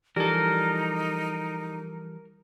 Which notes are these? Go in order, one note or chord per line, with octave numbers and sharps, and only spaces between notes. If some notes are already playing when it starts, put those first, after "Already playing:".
E3 F3 G3 D#4 A4 A#4